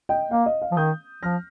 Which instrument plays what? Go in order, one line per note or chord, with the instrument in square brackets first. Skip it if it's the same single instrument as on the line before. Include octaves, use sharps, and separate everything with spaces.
[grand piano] D#5 G5
[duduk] A#3 [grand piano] F5
[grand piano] D#5
F5
[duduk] F3
[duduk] D#3 [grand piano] D#6 G6
[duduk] F3 [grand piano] F6 A#6